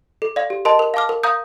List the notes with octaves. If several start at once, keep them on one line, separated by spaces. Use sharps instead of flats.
A4
D5 F5
G4
A#4 D#5 A5 C6
A#4
F5 A5 D6 F6
A#4
F5 A#5 D#6 G6